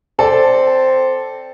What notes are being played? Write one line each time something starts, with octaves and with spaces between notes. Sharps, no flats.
C4 A4 D5 A5